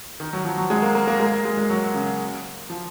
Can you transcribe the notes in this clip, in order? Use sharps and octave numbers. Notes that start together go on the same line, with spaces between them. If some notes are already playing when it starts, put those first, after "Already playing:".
D#3
F#3
F3
F#3
G#3
A#3
A#3
A#3
G#3
A#3
G#3
G#3
F#3
C#3
F3